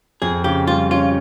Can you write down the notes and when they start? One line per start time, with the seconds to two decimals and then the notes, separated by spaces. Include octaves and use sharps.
0.22 F2 G#4
0.44 C#3 G4
0.67 G3 F4
0.91 C#4 F4